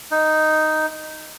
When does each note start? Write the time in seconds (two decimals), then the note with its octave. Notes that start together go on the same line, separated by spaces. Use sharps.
0.11 D#4